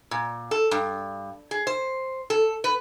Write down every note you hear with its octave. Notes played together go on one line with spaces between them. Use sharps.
A#2
A4
G2
G#4
C5
A4
B4